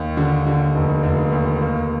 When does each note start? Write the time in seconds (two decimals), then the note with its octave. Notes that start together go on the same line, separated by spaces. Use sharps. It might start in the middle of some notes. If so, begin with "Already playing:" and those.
Already playing: D#2
0.17 D3
0.46 D3
0.75 F1
1.03 F1
1.32 D#2
1.61 A#3